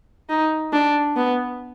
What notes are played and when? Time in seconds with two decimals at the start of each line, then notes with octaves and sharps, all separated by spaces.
0.29 D#4
0.73 D4
1.16 B3